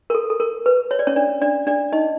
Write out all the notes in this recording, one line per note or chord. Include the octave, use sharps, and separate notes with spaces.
A#4
A4
A4
A#4
B4
C#5
D5
C#4 C#5
D4 D5
D4 D5
D4 D5
D#4 D#5